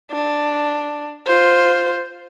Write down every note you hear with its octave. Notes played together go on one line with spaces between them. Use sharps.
D4
F4 C5